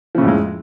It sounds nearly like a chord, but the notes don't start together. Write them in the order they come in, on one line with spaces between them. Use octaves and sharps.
F3 C#3 A2 F2 G#3